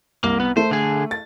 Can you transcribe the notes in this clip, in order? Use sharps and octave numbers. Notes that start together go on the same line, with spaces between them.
C2 A#3
B3
A3 C5
D3 G#4
A6